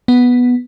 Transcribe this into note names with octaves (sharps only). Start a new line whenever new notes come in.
B3